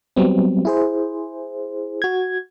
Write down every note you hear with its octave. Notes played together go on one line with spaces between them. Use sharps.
F#3 G3 B3 C4
E4 G#4 C5
F#4 G#6